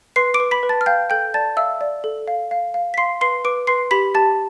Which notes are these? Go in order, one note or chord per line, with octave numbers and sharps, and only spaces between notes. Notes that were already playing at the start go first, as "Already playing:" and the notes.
B4 C6 C7
D6 D7
B4
B5 B6
B4
A5 A6
F6
F5 G5 G6
A4 G5 G6
D5 A5 A6
E5 F5 E6
D5
A4
F5
F5
F5
B6
F5 C6 C7
B4 C6 C7
B4 D6 D7
B4 C6 C7
G4 B5 B6
G4 A5 A6